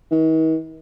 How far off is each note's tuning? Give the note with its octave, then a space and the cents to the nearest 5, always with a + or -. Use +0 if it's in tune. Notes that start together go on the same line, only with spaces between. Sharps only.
D#3 +45